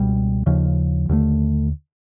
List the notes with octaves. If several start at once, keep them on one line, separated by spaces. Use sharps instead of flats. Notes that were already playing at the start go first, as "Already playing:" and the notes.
Already playing: C#2 B2 G3
D#2 C#3 F3
D#2 D3 F3 A3